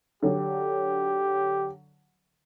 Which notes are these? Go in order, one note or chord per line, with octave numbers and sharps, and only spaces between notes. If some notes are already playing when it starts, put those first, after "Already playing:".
D3 F#3 G4